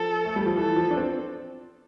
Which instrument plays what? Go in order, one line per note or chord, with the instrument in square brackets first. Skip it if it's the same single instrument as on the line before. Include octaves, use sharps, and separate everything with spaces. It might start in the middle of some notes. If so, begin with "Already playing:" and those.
Already playing: [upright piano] F3 [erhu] A4
[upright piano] A3
G3
F3
[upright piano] E3 [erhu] A4
[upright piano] F3
D4
C4